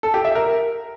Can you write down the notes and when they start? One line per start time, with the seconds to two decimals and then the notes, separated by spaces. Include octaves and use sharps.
0.03 A4
0.14 G4
0.25 E5
0.35 A#4